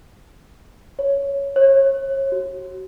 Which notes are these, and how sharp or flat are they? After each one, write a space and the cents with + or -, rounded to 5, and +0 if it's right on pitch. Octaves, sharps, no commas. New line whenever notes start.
C#5 +5
C#5 -30
F#4 +25